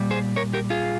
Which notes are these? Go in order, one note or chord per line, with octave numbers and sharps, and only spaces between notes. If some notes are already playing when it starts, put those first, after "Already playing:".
Already playing: A#2 G3
G#4 C5
A#4 C#5
G4 A#4
F4 G#4